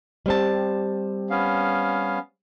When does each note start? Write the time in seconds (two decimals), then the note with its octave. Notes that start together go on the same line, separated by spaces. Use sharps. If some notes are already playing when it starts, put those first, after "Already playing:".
0.26 G3 C4 A5
1.30 B3 C#4 F5